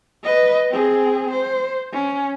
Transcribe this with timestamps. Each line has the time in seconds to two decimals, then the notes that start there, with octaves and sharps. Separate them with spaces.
0.24 B4 D#5
0.71 C4 G#4
1.31 C5
1.93 C#4